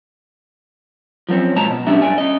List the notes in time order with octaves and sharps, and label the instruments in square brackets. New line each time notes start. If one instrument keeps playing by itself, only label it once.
[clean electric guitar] F3 F#3 A#3 C4 C#4
A#2 F#3 G#3 A5 A#5
B2
C#2 F#3 G3 C#4 D4 E5
G2 D5 G#5
C#4 D#5